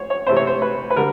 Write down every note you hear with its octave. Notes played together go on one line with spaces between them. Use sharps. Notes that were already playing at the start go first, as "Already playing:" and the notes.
Already playing: C5 C#5
C#5
C3 E3 A3 C4 C5
C#5
C5
B4
B4
D3 G3 A#4